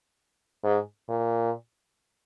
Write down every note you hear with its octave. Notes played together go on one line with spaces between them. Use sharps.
G#2
A#2